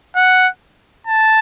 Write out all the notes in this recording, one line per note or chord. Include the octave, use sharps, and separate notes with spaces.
F#5
A5